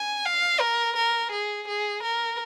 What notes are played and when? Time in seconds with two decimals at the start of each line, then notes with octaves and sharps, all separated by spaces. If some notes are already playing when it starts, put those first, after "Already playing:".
Already playing: G#5
0.26 F5
0.61 A#4
0.96 A#4
1.32 G#4
1.68 G#4
2.03 A#4